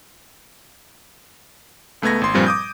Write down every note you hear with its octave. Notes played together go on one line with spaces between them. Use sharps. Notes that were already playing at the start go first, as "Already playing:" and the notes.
C#2 A3 B3 G#6 A#6
G#1 C6
G2 A#2 F3 G3 C4
D6 D#6 G6